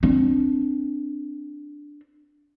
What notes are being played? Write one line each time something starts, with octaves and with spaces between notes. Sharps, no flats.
C4 D4